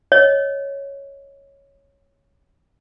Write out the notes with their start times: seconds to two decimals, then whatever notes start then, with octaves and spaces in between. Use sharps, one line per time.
0.12 C#5 D#5